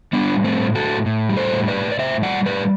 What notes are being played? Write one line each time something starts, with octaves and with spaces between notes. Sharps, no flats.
G3 B3 D4
A2
A3 C4
A2
F#4 A4
A2
A2
G3
A4 C5
A2
B4 D5
A2
D5
A2 C5 E5
G3 D5 F#5
A2 B4 D5